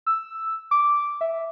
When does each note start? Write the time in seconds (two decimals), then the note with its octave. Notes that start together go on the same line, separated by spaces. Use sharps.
0.07 E6
0.71 D6
1.21 E5